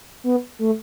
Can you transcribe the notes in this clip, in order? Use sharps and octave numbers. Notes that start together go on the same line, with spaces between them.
B3
A3